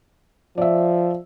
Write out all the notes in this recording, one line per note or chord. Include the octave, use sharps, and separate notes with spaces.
F3 D5 E5